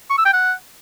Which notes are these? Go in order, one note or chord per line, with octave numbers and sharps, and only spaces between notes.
C#6
E6
G5
F#5